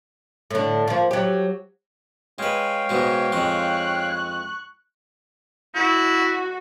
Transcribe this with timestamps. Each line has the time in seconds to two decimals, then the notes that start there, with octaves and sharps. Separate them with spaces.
0.50 A2 D3
0.87 F3 A#3
1.11 F#3 G4
2.39 G#3 B4 C#5 F5 G5
2.89 G#2 B2 G#3
3.32 F2 G#3 C6 C#6 F#6
5.75 E4 F#4